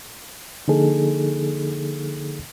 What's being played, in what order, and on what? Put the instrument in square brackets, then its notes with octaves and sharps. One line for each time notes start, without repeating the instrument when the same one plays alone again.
[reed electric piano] D3 F3 A#3 D#4 G#4 A4